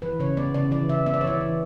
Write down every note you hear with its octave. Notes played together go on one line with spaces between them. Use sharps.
E3 B4
C#3 C#5
B3 D5
C#3 D5
E3 D5
C#3 E5
B3 E5
D5
C#5
E3 D5
E3